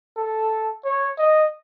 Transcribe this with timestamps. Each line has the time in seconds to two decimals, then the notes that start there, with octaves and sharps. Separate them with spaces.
0.17 A4
0.85 C#5
1.18 D#5